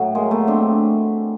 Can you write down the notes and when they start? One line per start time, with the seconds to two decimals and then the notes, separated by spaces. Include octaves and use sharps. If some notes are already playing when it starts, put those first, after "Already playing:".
Already playing: A2 F#3
0.15 G#3 A#3
0.31 A3 B3
0.47 C4 D4